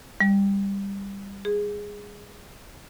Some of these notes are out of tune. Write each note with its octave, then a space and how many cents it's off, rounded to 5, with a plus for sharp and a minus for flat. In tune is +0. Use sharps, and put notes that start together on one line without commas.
G3 +15
G#4 -10